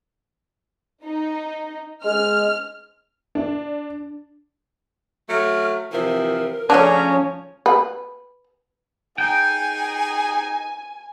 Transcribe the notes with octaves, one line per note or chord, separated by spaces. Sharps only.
D#4
G#3 F6
D4
F#3 A3 F6
C3 E3 F3 A#4
C#3 F3 A3 C#4 D4 C#5 G#5 A#5
B4
D#4 G#4 G5 G#5